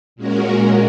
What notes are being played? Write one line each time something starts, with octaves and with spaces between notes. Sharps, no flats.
A#2 G#3 C#4 F#4 A#4